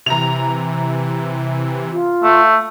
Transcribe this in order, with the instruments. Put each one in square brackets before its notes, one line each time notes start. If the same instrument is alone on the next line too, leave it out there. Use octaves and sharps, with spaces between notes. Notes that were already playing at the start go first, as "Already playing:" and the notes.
[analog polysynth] C3 E3 [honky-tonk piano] A#5 F7
[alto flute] F4
[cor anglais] A3